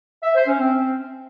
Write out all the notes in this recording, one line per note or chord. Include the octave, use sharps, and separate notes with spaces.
E5
C5
C#4
C4